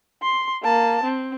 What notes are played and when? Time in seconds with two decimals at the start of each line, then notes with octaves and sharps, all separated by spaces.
0.22 C6
0.63 A#3 A5
1.03 C4